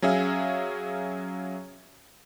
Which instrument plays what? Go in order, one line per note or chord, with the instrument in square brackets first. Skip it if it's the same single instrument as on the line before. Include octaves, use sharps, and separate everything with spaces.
[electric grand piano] F#3 C#4 G#4 E5 F5